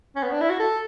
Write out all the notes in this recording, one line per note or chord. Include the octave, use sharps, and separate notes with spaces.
C#4
B3
D4
E4
F#4
A4